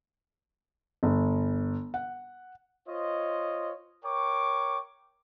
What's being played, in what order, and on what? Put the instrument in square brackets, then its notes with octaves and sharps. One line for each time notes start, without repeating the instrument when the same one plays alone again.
[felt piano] G1
F#5
[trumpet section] F4 C5 C#5 D#5
A#4 C#5 G5 C#6 D6